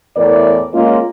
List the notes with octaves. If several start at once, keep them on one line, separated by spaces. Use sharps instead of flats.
E2 A2 A#4 D5
G#3 A#3 C#4 F4